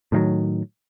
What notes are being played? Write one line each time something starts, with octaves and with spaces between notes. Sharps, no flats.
A2 D#3 F3 F#3